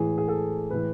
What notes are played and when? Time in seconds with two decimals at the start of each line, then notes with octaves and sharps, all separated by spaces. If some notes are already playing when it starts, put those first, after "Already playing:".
Already playing: A2 E3 G#3 G#4
0.18 G#4
0.28 A4
0.70 A2 E3 G#3 B4